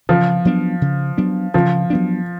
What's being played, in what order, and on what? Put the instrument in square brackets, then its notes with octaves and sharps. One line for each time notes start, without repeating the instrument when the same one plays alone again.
[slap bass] C#3 [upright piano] F3
[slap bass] F#3 B3 D4
C#3
F#3 B3 D4
[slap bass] C#3 [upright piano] F3
[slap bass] F#3 B3 D4